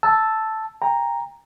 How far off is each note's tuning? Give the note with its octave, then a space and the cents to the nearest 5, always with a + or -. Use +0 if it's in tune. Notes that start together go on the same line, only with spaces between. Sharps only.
A5 +0 E6 +0
G5 +30 A#5 +0